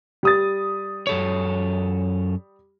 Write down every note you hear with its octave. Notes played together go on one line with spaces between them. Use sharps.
G3 D#6 A6
F#2 A4 C#5